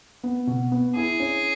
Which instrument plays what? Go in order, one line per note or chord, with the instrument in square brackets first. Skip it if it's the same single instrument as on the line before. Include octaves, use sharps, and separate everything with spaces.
[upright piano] B3
B2
B3
[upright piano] E4 [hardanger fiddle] G#4
[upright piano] C#4